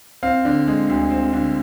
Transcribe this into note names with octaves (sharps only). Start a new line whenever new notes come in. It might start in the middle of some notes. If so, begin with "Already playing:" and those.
C4 F5
D3
G#3
D2
C4
D3